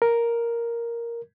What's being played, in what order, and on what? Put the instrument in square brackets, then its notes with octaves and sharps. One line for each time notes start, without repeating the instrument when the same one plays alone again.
[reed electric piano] A#4